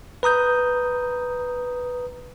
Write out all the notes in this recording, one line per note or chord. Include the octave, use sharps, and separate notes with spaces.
B4 A#5 D#6 G6